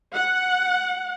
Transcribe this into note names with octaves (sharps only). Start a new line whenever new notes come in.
F#5